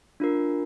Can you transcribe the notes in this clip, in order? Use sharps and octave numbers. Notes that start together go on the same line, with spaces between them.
D4 F4 A#4